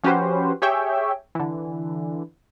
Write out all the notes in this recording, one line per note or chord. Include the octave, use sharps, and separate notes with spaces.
F3 C#4 F#4 G4 B4 C5
G4 G#4 C#5 E5 G5
D3 E3